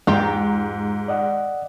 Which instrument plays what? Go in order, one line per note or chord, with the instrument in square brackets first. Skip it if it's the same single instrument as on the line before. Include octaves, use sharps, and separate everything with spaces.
[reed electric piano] E2 G#3 [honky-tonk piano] G#2 A#5 [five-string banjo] F4 G4 G5
[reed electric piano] D5 D#5 F#5